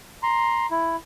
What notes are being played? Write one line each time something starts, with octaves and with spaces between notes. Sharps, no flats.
A#5 C6
E4